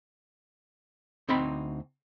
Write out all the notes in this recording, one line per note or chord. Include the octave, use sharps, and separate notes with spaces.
D2 C4 D#4 G5 B5